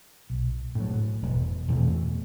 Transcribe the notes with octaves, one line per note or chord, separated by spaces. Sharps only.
B1
A2 F#3
E1
E2 B2 A3